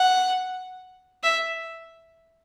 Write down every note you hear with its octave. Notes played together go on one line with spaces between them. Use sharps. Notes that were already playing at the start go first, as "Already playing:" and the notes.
Already playing: F#5
E5